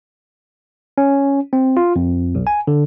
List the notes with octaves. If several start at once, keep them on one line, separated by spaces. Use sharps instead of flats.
C#4
C4
F4
F2
B1
G#5
D3